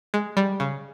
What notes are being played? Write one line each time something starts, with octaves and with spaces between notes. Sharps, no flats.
G#3
G3
C#3